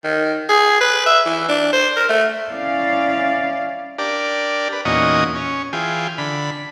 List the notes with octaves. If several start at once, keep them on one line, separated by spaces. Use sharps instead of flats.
D#3
G#4
B4
E5
E3
D4
C5
A#4
A3
C#4 E4 D5 F5
D4 G4 A#4 D5
B4
E2 A#2 C#4 D#4 F#4 D#5
C#4
E3 F4 G#4 G5
D3 B5